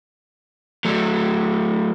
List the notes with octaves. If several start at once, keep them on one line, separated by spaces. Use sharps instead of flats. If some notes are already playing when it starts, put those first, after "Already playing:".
F#3 A3